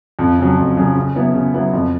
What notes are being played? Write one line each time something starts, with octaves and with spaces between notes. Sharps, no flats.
F2
C#3 F#3
F2
C#3 F#3
C#3
F#3 B3 E4
C#3
F#3 B3 E4
F2